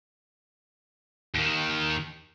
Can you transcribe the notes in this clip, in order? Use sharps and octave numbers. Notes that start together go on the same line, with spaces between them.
D#2 D#3